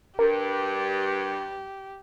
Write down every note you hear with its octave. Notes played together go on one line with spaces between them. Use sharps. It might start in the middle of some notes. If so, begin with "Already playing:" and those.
G2 G4 A#4